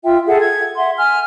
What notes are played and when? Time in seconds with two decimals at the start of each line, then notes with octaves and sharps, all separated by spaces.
0.03 F4 E5 G5
0.27 G#4 A4 E5 F#5
0.40 G#6
0.77 E5 F#5 C6
0.99 G#5 F6